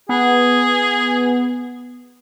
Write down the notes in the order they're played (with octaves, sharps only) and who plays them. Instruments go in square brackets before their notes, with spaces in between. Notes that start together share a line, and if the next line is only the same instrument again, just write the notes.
[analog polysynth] B3 [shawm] G#4